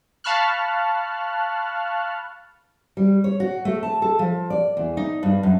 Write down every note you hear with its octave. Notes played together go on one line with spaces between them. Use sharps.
F5 A5 B5 C#6 F6 F#6
G3
C#5
F#4
A3
A5
A4
F3
D5
E2
D#4
G2
F#2